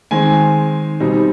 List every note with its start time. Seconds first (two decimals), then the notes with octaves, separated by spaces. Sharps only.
0.11 D#3 G#3 C4 G#5
1.00 B2 G3 C4 D#4